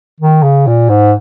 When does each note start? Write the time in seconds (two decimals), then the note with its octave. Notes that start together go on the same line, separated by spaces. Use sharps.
0.20 D#3
0.43 C#3
0.67 A#2
0.89 G#2